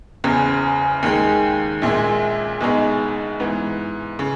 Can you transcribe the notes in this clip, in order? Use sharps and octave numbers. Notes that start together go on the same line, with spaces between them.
F#1 E2 C#3
D#2 D#3 G#3
A#1 A#2 G#3
B1 B2 G#3 D#4
G#2 E3 B3
C#3